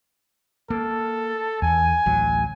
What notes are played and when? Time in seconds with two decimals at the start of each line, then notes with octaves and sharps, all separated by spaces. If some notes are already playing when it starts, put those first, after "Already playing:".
0.70 A#3 A4
1.62 E2 G#5
2.06 A1 D2 F#3